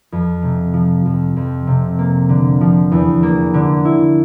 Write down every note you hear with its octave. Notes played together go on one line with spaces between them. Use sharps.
F2
C3
F3
F2
F2
C3
A#3
D3
F3
E2
A#3
D3
E4